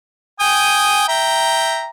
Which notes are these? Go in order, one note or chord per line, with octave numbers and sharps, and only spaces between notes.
G5 G#5 D#6
E5 G5 A#5